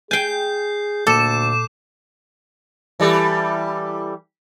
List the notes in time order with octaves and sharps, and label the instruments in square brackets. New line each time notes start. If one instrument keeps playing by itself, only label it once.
[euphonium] G#4 [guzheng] G5 G#5 [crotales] G6 C7
[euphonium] D2 [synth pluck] A#2 [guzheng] A4 [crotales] D6 E7
[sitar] E3 G3 A4